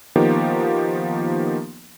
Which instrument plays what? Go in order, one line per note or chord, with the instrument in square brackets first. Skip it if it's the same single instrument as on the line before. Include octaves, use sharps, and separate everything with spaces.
[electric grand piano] D#3 F3 A#3 B3 D#4 G4